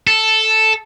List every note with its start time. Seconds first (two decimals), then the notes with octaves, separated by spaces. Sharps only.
0.07 A4